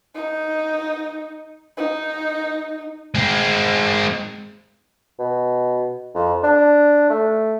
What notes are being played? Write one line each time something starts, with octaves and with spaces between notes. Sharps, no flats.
D#4
D#4
G#3 C4
B2
F2
D4
A3